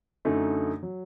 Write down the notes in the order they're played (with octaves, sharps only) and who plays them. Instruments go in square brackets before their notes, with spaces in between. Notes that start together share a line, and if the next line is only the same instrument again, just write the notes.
[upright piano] F#2 D3 A3 D#4
F#3